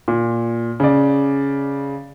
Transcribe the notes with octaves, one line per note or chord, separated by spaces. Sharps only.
A#2
C#3 D5